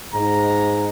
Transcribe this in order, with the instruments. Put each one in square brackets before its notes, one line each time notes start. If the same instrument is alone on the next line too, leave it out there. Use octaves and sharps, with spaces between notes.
[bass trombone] G#2 [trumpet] A#5